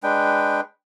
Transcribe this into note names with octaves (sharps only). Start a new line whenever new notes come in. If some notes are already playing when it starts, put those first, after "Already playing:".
G#3 D4 B4 G5